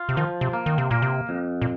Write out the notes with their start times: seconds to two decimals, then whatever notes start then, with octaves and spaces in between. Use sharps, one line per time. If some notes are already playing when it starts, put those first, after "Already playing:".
Already playing: F4
0.09 C3
0.17 D#3 F3
0.41 C3
0.53 A#3
0.66 D#3
0.78 C3
0.91 A#2 A#3
1.02 C3
1.29 F2
1.62 A#2